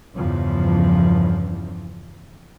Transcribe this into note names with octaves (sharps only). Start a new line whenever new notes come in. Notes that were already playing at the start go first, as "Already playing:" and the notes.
E2 G2 C#3 E3 F3